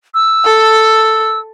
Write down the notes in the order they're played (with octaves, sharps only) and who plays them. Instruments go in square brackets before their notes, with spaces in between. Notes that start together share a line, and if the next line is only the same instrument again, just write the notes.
[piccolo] E6
[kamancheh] A4